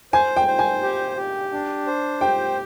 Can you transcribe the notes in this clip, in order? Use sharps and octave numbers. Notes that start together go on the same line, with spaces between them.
C5 G#5
G5
C5
G#5
G4
G4
D4
C5
G4 G5